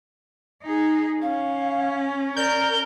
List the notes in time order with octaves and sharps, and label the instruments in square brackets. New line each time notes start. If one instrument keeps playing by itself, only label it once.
[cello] D#4 G#4
[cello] C#4 [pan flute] F5
[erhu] A#4 [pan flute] D5 [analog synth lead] G6